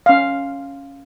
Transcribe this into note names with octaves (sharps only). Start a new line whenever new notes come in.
C#4 F5